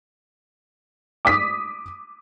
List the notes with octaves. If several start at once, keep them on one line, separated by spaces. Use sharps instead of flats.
D6 D#6 B6